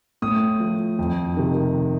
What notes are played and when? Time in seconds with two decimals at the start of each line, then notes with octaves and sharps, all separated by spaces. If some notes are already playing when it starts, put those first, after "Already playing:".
0.22 A2 D#6
0.60 F3
0.99 F2
1.37 C3 D#3